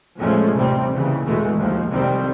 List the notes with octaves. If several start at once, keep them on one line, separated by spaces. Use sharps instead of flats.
F2 A#2 F3 G#3 A3 C#4
A1 D#2 C3 G3 C4
D#2 C#3 E3
E2 B2 E3 G#3 A3
D#2 F3
C2 F2 D#3 G3 C4